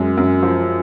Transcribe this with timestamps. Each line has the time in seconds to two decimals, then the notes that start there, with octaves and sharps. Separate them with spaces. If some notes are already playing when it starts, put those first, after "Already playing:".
Already playing: F#2 G#3
0.17 F#2
0.43 F3